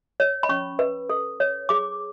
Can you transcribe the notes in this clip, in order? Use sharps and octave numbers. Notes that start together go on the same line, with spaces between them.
C#5
B5
C#4 C#6
B4
A4
C#5
G#4 D6